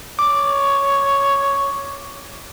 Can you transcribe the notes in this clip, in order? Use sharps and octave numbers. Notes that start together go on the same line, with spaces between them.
C#5 D6